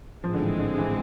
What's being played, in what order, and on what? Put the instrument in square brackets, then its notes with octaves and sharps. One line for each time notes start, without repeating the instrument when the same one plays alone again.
[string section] A1 G#2 G#3 C4 [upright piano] F3
[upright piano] D3
E3
D3
E3